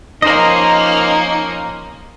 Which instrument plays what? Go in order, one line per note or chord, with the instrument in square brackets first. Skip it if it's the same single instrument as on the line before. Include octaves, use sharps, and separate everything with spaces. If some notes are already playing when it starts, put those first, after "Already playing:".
[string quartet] F3 A#3 C#4 [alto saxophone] D#4 [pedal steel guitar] A#4 C5 D#5